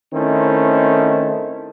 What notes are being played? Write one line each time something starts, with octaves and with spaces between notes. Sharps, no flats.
D#3 A3 C4 C#4 E4 C5